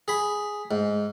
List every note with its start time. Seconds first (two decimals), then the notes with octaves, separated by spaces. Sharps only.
0.08 G#4 B5
0.71 G#2